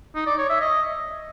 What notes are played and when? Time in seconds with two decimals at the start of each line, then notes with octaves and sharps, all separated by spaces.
0.15 D#4
0.26 D5
0.38 C#5
0.49 E5
0.61 D#5